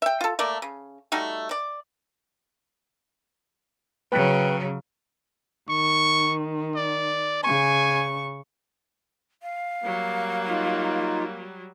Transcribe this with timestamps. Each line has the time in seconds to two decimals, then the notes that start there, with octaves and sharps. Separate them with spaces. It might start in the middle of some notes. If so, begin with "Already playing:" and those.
0.02 E5 G5
0.21 F4 A4
0.39 A3 A#3 D5
0.62 C#3
1.12 G3 A3 D#4 F#4
1.51 D5
4.12 C#3 F#3 B4 G5 F#6
5.69 D#3 C#6
6.76 D5
7.43 C#3 G#5 C#6
9.43 F5
9.84 F#3 G3 A#3
10.48 D#4 F4